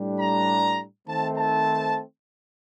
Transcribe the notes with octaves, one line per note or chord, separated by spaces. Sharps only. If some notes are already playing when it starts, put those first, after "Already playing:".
Already playing: A2 G3 D4
A#5
D#3 A3 C4 A5
A5